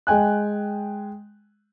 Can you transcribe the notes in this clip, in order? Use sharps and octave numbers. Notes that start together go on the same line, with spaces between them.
G#3 G5 G#5 F#6